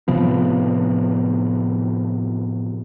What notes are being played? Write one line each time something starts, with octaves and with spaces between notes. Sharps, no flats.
A2 C3 F3 B3